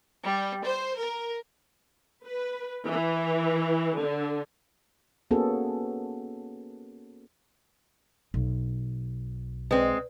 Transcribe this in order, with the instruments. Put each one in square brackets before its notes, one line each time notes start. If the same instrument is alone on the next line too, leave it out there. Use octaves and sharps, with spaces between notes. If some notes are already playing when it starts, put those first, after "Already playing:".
[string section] G3
C5
A#4
[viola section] B4
E3
D3
[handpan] A#3 B3 C#4 F#4 G#4 A4
[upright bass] B1
[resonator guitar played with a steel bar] G#3 C4 [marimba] B4 D5